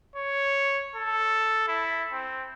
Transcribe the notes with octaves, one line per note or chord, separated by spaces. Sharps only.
C#5
A4
E4
C4